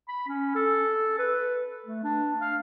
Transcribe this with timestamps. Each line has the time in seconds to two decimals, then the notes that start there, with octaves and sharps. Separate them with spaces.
0.08 B5
0.28 C#4
0.56 A4
1.19 B4
1.86 A3
2.03 D4
2.41 F5